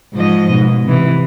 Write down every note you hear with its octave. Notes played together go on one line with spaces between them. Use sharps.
G#2 F3 D#5
G#2 B2
C3 E3